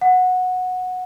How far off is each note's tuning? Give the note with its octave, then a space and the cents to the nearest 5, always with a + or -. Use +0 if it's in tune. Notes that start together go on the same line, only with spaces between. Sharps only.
F#5 -10